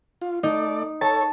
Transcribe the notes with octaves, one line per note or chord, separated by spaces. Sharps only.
F4
A3 D#4 D5
A4 C#5 A5